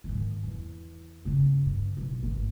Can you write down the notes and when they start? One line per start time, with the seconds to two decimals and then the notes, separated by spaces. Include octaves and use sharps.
0.04 G#2 D#3
0.43 E2
1.25 G2 C#3
1.66 G2
1.97 B1
2.23 G#1 G2